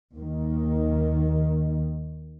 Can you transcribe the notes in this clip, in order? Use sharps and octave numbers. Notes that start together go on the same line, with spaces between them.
D#2 D#3